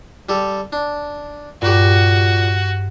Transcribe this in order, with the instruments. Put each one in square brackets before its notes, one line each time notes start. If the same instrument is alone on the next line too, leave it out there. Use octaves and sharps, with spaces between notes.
[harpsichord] G3 G4 A4
D4
[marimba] G2 [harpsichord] A#2 G4 [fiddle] F#4